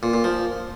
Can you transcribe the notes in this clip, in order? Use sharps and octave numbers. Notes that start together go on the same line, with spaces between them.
A#2
A#2
F3